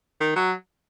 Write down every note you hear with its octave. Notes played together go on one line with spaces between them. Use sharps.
D#3
F#3